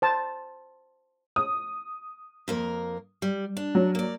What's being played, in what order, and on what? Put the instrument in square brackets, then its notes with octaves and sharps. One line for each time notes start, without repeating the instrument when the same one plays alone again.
[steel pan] C5 A5
[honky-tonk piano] D#6
[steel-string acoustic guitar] F2 A#3 A#4
G3
D4
[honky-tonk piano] F#3
[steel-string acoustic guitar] A#3 D5